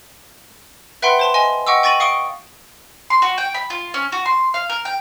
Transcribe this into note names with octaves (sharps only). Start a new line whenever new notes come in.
B4 E5 F#5 G5 B5 C6
C5 A5 C6
D#5 G#5 C6
D#5 F#5 G5 C#6 D6 E6
G5 C#6 A6 A#6 D#7 F#7
F5 C#6 D#6 C#7 D7 G7
C6
F#4
G5
B5
F4
C#4
F#4
C6
F5
A#4
G5